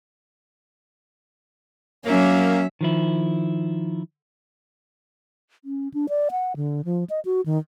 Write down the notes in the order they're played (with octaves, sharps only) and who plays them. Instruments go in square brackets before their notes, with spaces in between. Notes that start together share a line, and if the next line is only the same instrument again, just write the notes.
[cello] F#3 E5 [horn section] A#3 [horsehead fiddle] C#4
[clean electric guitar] D#3 F3 E4
[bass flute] C#4
D4
D5
F#5
D3
F3
D#5
F#4
D#3